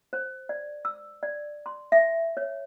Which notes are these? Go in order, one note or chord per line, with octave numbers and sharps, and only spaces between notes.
C5
D5
E6
D5
C6
E5
C#5